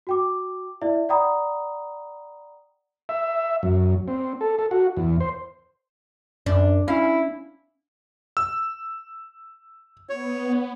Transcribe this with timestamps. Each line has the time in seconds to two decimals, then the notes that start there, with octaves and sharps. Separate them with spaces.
0.07 F#4 G5 D6
0.82 E4 D5 E5
1.09 D5 F#5 G5 A#5 B5 D#6
3.09 E5
3.63 F#2
4.08 C4
4.41 A4
4.59 A4
4.71 F#4
4.97 E2
5.20 C5
6.46 F#2 D4
6.88 C#4 E4 F5
8.37 E6
10.09 B3 C#5